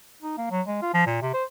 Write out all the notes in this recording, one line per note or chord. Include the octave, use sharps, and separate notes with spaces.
D#4
A#3
F#3
G#3
F4
F3
A#2
C3
C5